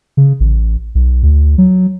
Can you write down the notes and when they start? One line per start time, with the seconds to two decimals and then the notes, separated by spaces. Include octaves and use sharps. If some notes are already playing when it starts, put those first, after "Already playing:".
0.17 C#3
0.40 A1
0.95 B1
1.23 D2
1.58 F#3